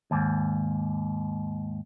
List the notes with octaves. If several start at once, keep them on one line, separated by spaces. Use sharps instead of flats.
D#2 G#2